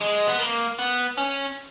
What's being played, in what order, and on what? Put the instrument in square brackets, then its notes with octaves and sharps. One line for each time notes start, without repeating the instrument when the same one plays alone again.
[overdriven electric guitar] G#3
B3
A#3
B3
C#4